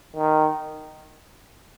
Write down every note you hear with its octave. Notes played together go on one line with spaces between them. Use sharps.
D#3